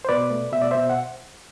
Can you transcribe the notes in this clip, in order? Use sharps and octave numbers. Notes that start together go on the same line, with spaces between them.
C5
B2 B4 D5
A3
B2 E5
D5
B2 C5 E5
F#5